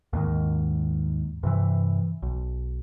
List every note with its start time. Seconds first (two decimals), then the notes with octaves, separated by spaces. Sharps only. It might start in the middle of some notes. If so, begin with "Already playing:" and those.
0.13 D#2 G#2 D#3
1.43 G2 C3 E3
2.22 B1